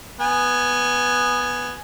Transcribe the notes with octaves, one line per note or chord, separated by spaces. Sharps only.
B3 G#5